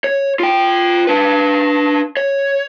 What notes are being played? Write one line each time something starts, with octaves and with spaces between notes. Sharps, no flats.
C#5
F4 G5
D4 B4
C#5